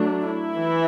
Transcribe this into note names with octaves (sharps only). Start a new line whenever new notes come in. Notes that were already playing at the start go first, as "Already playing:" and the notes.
Already playing: F#3 A3 D4
E4
E3